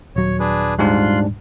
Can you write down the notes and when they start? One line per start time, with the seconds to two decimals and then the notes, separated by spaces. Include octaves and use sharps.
0.16 D#1 F#3 C#5
0.40 D4 G#4 B4
0.79 G#2 G3 D4 F4 C6 F#6